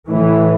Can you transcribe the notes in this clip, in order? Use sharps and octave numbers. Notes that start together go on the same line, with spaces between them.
A2 E3